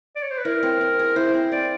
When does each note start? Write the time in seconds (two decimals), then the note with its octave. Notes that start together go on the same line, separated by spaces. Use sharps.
0.16 D5
0.23 C#5
0.31 C5
0.38 B4
0.45 E4 A#4
0.63 C4
0.81 C4
0.99 G#4
1.16 E4 C5
1.34 C4
1.52 C4 D5